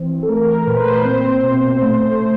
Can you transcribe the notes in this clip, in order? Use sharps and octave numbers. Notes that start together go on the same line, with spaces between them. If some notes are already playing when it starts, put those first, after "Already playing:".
Already playing: E3 C4
A4
A3 A#4
A#2 B4
C5
B4
C4 C5
B2
A3
C#3